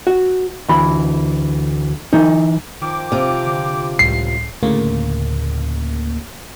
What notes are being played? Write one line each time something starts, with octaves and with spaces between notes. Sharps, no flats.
F#4
D2 E3 B5
E3 D#4
D#3 F3 G5 D6
C3 F4
D3
C#2 A2 G3 C7
D2 A2 C#3 A#3